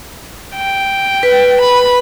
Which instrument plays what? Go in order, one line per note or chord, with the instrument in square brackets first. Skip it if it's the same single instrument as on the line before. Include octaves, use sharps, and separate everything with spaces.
[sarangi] G5
[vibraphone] B4
[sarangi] B5